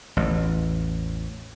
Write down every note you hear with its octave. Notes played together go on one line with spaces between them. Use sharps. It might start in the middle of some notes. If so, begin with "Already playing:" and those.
A1 E2